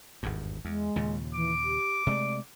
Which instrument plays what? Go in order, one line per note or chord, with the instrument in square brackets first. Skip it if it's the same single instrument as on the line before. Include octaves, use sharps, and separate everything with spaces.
[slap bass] G#1 E2 G2
[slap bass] E2 [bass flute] G#3
[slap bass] D#2 A#2 C#3
[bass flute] E3 [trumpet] D6
[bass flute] G4
[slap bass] C3 G#3 A3 [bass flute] D5